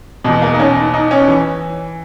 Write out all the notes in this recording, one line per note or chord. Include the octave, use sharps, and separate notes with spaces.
E2 B2 G#3
A#3
D#4
C#4
D#4
D#4
C#4
E3